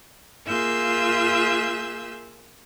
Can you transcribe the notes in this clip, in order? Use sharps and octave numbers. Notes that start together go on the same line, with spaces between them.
A#3 F4 G#4 E5 E6 G6